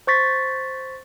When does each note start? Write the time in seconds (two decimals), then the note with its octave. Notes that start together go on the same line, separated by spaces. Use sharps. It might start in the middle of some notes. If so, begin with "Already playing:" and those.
0.07 C5 C#6 A6 B6